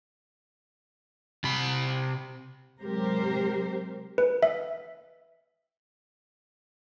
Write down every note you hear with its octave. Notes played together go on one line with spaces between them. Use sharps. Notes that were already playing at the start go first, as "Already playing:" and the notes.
C3 B5
C3 F#3 G#3 G4 A#4 C5
B4
E5